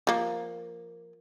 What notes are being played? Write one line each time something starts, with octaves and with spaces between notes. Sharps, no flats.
F3 A#3